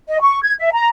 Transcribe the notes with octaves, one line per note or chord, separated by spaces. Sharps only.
D#5
C#6
G#6
E5
A#5